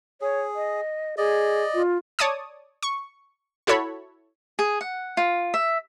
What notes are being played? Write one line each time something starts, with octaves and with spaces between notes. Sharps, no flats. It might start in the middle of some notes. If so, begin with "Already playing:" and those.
G#4 C#5
D#5
G#4 D5 D#5
F4
C#5 D5 A5 D#6
C#6
E4 F#4 A4 C#5 B5
G#4
F#5
F4
E5